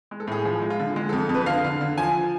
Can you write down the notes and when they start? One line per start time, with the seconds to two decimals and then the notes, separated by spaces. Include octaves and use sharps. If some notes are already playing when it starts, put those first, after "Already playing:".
0.11 G#3
0.20 A4
0.27 A2 G#4
0.45 F3 G#4
0.62 G#3
0.70 F4
0.79 D3
0.96 G#3
1.09 F2 A4
1.29 F2
1.34 B4
1.46 D3 F5
1.64 D3
1.81 D3
1.98 F3 G#5